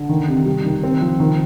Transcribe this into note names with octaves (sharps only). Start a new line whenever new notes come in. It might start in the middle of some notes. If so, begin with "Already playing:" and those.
Already playing: D3
D#3
C3
G3
D#3
C4
F3
D#3